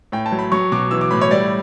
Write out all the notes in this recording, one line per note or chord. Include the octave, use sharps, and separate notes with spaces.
A2 G5
A5
F#3
B5
F#3 C#6
B2 D6
E3 E6
D6
A2 B5
C#5
G3 D5